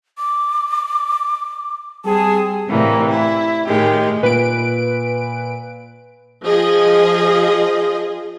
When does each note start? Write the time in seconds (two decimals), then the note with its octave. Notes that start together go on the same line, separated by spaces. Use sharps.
0.18 D6
2.05 G3 C4 G#4 A5
2.68 A2 C3 E3 G3 A#3
3.11 E4
3.68 A2 D#3 G#3 G4
4.23 A#2 B4 D7
6.44 F3 G#4 D#5